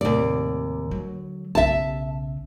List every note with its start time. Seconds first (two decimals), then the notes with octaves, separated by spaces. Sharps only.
0.01 D#2 A2 C3 D5
0.91 D3 F#3
1.55 B1 C#3 E5 A5